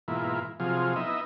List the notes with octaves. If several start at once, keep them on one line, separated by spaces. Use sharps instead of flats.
G#2 B2 E3 A#3 E4 F4
C3 F3 F#3 F4 G#4
B3 D#4 E4 D#5 E5